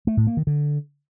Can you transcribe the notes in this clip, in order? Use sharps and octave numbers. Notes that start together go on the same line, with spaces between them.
A3
A2
A#3
D#3
D3